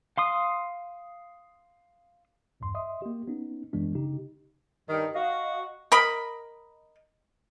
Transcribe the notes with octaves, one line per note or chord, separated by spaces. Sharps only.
F5 C6 D#6
A#1 E2 G2 C6
D#5 E5 C6 D#6
A#3 G4
B3 C#4 D#4
A1 F#2 E3 G#3 B3 D4
C#3 D#4 G4
G2 D#3
F#4 D#5 F5
A#4 D#5 B5